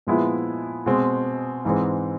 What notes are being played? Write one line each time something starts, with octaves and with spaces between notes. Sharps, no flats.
A#2 F3 G#3 B3 E4
B2 G#3 C4
G#2 E3 G#3 C4